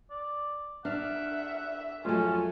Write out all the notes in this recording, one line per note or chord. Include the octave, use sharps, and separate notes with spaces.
D5
D4 E5 F#5 F6
F2 F#3 G#3 A3 C#4 F4 A4 G#5